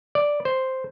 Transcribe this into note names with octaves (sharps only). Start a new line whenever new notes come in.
D5
C5